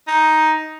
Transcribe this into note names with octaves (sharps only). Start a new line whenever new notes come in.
D#4